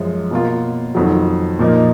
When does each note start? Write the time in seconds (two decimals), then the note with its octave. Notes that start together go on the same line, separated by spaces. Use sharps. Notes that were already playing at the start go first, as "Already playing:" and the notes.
Already playing: F#2 F3 G#3
0.31 B2 A#3 F4
0.95 F2 D#3 F#3
1.59 A#2 F3 A#3 D#4